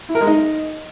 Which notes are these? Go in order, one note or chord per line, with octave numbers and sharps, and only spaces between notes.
E4
A#4
G#3
D#4